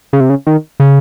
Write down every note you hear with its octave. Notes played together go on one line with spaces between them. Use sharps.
C#3
C3
C#3
D#3
C#3